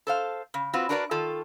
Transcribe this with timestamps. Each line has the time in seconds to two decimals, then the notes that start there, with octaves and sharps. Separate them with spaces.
0.07 A4 C5 F5
0.54 C#3
0.73 C4 F4 F#4 B4
0.89 D4 F#4 A#4 B4 C#5 D5
1.11 D#3 F4 A4